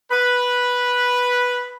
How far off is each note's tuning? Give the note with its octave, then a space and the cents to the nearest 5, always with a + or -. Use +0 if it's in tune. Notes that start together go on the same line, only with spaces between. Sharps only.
B4 -5